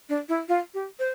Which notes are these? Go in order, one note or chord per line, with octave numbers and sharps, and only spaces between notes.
D4
E4
F4
G4
C5